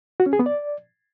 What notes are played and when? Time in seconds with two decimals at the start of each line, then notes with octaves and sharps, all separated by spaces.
0.20 F#4
0.26 C#4
0.33 G#4
0.39 B3
0.46 D5